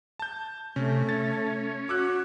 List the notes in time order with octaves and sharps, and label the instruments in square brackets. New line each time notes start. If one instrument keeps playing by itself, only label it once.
[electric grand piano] A5 G6
[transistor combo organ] C3 [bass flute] A3 [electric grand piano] C#4
[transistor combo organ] C#4 [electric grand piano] A6
[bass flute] F#4 [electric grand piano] D6 E6 F#6